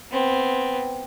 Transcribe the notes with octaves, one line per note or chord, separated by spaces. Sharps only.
B3 C4